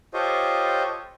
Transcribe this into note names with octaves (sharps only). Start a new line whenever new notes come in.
F4 G4 A4 C5 C#5 D#5